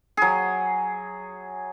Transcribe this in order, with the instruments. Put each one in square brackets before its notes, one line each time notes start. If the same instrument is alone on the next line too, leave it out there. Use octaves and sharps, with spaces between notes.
[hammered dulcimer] F#3 G#4